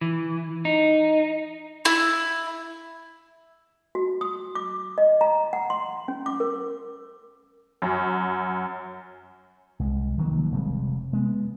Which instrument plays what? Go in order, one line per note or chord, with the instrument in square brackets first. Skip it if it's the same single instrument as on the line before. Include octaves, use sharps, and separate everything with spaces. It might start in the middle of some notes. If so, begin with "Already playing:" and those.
[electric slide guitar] E3
D#4
[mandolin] E4
[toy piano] F#4
D#6
D6
D#5
A#5
F#5
C6
C#4
D6
A#4
[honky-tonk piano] F#2
[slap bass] C2 G#3
D#3 F3 F#3 A#3
F1 C3 G3 G#3
G#3 B3